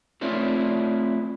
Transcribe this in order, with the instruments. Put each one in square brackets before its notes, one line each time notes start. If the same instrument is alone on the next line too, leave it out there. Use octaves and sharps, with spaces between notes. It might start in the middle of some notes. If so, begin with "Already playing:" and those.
[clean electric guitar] A3 C4 E4 F4 C#5 D5